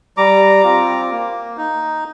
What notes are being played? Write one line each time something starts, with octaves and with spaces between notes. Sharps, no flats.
G3 A#5 D6
C4 F4
A#3
D#4